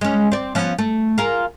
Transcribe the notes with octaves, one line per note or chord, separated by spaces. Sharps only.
G#3 C#4
C4 D5
F3 B3 C#4
A3
F4 G#4 A#4